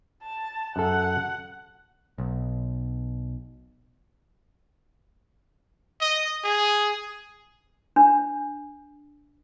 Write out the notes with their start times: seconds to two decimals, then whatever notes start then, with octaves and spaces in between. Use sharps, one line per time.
0.22 A5
0.76 F#2 A4 F#5
2.18 B1
6.01 D#5
6.44 G#4
7.96 D4